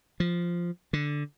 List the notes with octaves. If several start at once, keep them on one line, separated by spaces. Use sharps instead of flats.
F3
D3